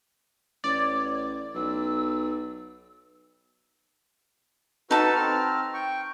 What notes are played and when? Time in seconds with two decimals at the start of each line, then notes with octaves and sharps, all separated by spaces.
0.64 A1 C#5 D5
1.54 B1 E6
4.91 D#4 F#4 A4 B4 A5
5.15 C4 F6
5.74 G5 C#6